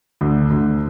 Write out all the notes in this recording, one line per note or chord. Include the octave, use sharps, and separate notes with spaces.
D2
D2